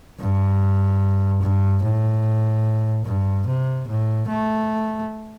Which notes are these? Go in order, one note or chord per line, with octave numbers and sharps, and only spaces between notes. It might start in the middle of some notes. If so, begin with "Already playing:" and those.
G2
G2
A2
G2
C3
A2
A3